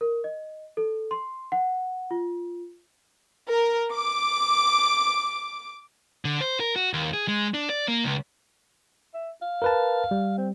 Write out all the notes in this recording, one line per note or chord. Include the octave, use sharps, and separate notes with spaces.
A#4
D#5
A4
C6
F#5
F4
A#4
D6
D3
C5
A#4
F#4
D#2
G#4
G#3
D4
D5
A#3
C#2
E5
F5
A#4 B4 A5
G3
C4